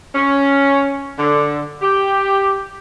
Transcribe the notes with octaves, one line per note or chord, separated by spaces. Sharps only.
C#4
D3
G4